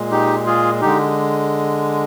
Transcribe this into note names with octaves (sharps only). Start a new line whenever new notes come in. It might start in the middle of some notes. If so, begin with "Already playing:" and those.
Already playing: A#2 G#3
D#4 G4
F4 G#4
D3 G#3 D#4 G4